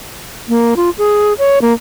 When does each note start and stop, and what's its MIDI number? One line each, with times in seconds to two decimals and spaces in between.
0.49 0.74 58
0.76 0.90 65
0.98 1.33 68
1.38 1.59 73
1.62 1.73 58